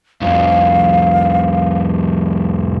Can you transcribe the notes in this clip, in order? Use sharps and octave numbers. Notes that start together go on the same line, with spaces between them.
C2 F2 F5